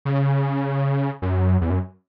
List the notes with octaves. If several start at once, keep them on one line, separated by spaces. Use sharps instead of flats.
C#3
F#2
E2
F#2